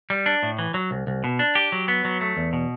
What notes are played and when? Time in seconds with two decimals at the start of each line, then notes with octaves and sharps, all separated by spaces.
0.10 G3
0.26 D4
0.43 A2
0.58 E3
0.74 F#3
0.91 C2
1.07 C2
1.24 B2
1.39 D4
1.55 G4
1.72 F#3
1.88 B3
2.05 F#3
2.21 A3
2.37 E2
2.53 B2